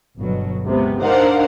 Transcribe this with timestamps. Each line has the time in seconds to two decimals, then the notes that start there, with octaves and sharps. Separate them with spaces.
0.18 G1 B2 F#3
0.66 C#2 C3 B3
1.02 D4 D#4 A#4 C5 F5 F#5